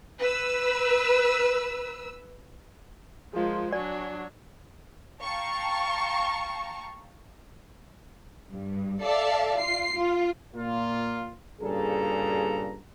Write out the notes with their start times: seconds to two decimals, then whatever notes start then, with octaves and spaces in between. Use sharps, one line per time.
0.20 B4 E6
3.33 F3 G#3 F4 G#4 A#4 C5
3.72 F#3 D4 F#4 C#5 D5 G#5
5.22 F5 G5 A5 A#5 C#6
8.51 G2
9.02 A4 D5 E5 F5 A5
9.59 F4 C7
9.95 F4
10.55 A#2 A#3 F4
11.61 G2 A#2 C#3 G#4 A4 A#5